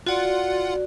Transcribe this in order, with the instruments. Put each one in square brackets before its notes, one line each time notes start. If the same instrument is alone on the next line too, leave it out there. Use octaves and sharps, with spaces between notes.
[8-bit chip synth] F4 F#5 [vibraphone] F#4 D5